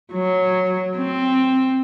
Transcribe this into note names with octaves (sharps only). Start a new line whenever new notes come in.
F#3
C4